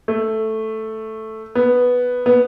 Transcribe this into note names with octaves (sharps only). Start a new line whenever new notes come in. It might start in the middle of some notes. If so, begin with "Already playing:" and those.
A3
B3
B3